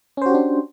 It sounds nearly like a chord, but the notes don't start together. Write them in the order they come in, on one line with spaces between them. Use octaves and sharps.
C#4 C5 F#4 G4 D4